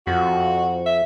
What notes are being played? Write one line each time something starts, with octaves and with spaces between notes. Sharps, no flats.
F2 F#4
E5